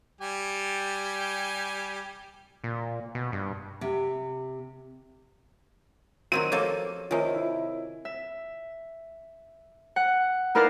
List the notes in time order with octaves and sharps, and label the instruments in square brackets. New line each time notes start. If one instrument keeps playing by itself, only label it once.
[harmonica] G3 G4 G#5
[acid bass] A#2
B2
G2
[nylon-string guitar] C3
[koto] D#3 F#3 C4 [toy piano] F#4 A#4 [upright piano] D#7
[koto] F3 A#3 A4 [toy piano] G4 C#5 D6
[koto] C3 D#3 [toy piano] F4 C#5 G#5
[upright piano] E4
[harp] E5
F#5
D#4 E4 A#4 B4 D5 F5